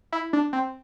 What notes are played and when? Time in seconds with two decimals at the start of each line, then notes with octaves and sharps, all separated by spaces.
0.12 E4
0.33 D4
0.53 C4